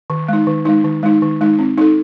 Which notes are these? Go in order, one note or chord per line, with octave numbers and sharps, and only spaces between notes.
D#3
G#3 D#4
D#3
G#3 D#4
D#3
G#3 D#4
D#3
G#3 D#4
C4
D#4 A4